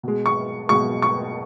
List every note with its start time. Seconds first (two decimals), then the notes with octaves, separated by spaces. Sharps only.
0.03 B2 G#3
0.26 C#6
0.69 B2 G#3 C#6
1.02 C#6